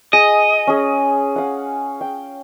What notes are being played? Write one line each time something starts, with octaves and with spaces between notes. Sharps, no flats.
G#4 D#5
C#4 G#4
F5 F#5
G5